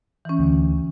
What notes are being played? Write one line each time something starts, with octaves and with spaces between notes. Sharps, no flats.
E3 C#4
D2